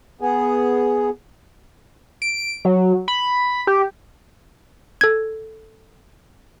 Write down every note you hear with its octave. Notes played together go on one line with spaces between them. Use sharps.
B3 G#4
D7
F#3
B5
G4
A4 G#6